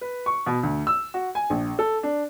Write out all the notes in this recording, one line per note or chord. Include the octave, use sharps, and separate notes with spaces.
B4
C#6
B2
D2
E6
F#4
G#5
A#1
A4
D4